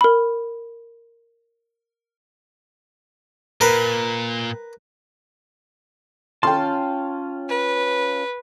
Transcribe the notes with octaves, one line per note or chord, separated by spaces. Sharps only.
A#4 B5
A#2 A#4 B4
C#4 F4 G5 A5 C6
B4